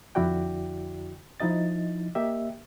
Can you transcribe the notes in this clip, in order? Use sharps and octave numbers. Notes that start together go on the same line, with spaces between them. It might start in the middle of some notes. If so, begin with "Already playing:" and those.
F2 D3 E4 F#4 D5 G5
F3 D#4 E4 D#5 A6
A#3 G4 D#5 E5